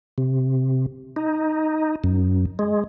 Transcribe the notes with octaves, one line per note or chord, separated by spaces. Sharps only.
C3
D#4
F#2
G#3